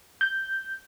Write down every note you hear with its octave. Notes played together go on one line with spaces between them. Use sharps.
G6